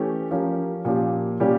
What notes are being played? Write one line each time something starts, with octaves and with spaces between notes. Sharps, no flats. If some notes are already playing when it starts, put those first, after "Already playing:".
Already playing: E3 A3 C#4 G4
F3 C#4 G4 A#4
A#2 F3 C#4 G4
A#2 G3 C#4 G4